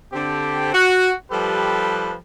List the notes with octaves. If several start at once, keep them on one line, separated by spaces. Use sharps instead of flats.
D3 C4 G4
F#4
F3 G3 G4 A4 B4